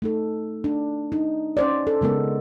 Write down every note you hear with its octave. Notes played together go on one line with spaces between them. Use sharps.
A3 D#4 A4
D4
D#4
C#4 C5 D5
A4
C#3 G#3 B3 A#4